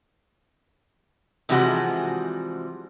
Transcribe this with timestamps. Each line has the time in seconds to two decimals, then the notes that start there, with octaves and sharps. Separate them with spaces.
1.49 C3 E3 F3 G3 G#3 F#4